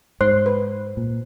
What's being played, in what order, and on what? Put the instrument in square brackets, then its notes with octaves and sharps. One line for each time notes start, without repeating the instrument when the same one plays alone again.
[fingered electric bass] G#2 [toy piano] C5 [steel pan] C6
[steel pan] B4
[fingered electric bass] A#2